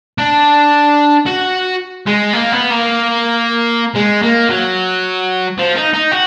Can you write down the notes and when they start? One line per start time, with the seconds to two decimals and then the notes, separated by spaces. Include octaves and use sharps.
0.18 D4
1.26 F#4
2.06 G#3
2.33 A#3
2.52 B3
2.70 A#3
3.95 G#3
4.23 A#3
4.49 F#3
5.58 F3
5.75 D#4
5.93 D#4
6.11 F#4